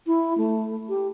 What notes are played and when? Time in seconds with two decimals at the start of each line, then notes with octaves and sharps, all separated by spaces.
0.07 E4
0.38 A3
0.89 G4